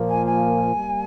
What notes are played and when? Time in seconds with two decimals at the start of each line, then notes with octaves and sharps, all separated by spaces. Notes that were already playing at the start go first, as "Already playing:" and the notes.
Already playing: A#2 F3 A#3
0.09 G#5
0.26 G#5
0.75 G3 A#3